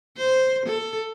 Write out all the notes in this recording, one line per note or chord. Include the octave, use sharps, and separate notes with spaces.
C5
A4